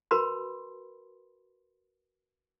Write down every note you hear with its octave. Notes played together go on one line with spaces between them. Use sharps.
F#4 A#4 B4 A5 B5 C6